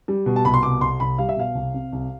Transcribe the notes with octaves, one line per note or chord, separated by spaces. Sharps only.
G3
B2
A5
C2 B5
C6
B2 D6
C2 C6
C2 B5
G3 F5
E5
B2 F5
C2
C3
C2